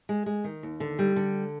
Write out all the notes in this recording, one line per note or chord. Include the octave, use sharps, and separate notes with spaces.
G#3
G#3
D#3
D#2
D3
G3
D3